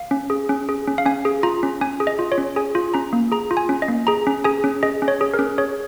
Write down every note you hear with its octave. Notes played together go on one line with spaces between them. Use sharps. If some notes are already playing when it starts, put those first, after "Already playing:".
Already playing: F5
C#4
G#4
C#4
G#4
C#4
F5
C#4 G#5
G#4
F4 A#5
C#4
C#4 G#5
G#4
D#5
F4
C#5
C#4
G#4 G#5
F4
C#4 A#5
A#3
G#4 A#5
F4
G#5
C#4
D#5
A#3
G#4 A#5
C#4
G#4 G#5
C#4
G#4 D#5
C#4
C#5
G#4
A#4
C#4
G#4 C#5